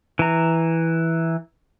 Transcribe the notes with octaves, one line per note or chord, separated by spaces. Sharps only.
E3 A#5